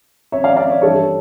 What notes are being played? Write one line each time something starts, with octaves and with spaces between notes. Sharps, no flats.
C#5 E5
D5 F5
D5 F5
C#5 E5
G2 E3 G3 D4 A4 C#5